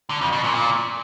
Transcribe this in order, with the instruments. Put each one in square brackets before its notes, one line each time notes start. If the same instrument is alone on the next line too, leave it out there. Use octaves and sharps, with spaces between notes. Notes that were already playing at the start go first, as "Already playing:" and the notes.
[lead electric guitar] D3
F2
B2
A#2
A#2